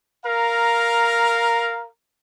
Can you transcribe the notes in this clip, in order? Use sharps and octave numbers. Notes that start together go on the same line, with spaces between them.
A#4 F5 A#5